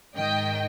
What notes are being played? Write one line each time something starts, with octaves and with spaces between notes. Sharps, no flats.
G#2 D#3 D#5 G5